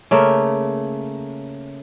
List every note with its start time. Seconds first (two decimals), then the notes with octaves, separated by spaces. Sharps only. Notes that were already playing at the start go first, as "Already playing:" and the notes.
0.11 C#3 A3 A#3